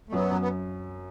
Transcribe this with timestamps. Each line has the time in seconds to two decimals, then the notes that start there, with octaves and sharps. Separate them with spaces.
0.09 A3
0.12 F#2 F#3 B3
0.31 F#2
0.41 B3